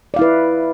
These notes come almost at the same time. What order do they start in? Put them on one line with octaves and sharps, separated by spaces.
D5 F5 E4 B4